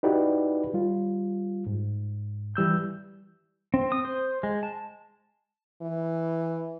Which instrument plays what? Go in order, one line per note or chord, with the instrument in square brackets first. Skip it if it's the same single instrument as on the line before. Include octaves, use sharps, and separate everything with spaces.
[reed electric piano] D#4 E4 F#4 G4 B4 D5
G3 F4
G#2
E3 G3 E6 G6
[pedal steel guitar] C4
D#6
C5
G#3
A5
[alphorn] E3